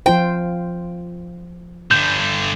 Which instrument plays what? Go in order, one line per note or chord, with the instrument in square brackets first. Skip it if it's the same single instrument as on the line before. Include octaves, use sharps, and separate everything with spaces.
[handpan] F3 F4 C5 [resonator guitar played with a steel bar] G5
[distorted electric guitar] G2 D3 [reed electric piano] G6